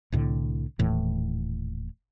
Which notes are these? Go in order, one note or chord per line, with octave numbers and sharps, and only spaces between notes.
C2 A2 D3
D#1 D#2 A2 E3